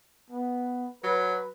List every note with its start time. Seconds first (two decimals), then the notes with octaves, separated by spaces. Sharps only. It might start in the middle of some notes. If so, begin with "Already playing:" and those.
0.30 B3
1.03 F#3 B4